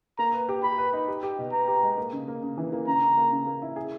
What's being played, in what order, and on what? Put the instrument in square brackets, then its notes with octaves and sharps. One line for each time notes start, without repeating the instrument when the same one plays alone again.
[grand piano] A#3 [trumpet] A#5
[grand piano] B4
G4
[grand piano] G4 [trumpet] B5
[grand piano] B4
D#4
G4
G4
B2
[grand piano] B3 [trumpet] A#5
[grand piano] G4
G#3
A#3
C#3
A#3
C#3
E3
A#3
[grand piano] C#3 [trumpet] A#5
[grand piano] C#3
A#3
C#3
A#3
E4
G#4